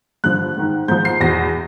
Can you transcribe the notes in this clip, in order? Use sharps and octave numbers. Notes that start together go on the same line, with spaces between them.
G2 D3 F3 F#6
G#2 D#3
G#2 F3 G6
C7
E2 B2 A#6